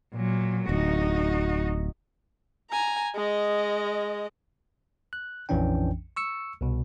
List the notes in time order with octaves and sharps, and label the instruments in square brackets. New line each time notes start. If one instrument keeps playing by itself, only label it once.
[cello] A#2 F#3
[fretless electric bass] D1 [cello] D#4 F#4
[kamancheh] G#5 A#5
G#3 D#5
[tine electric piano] F#6
A#1 F2 E3 C#4 D4 G5
C#6 E6 C#7
C2 B2